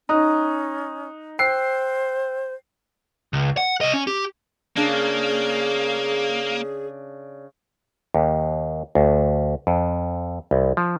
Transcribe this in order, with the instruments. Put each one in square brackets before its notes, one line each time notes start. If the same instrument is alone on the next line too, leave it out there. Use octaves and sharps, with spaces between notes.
[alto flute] C#4 [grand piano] D#4 [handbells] A#5 D#6 F#6
[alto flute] C5 [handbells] G5 E6 F#6 [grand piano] C7
[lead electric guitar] C#2
F#5
C2 D#5
C#4
G4
[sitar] C#3 D4 [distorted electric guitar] A#3 [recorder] G#4
[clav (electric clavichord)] D#2
D2
F2
C2
F3